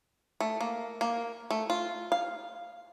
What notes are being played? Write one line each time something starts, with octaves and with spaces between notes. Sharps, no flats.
A3
A#3
A#3
A3
F4
F5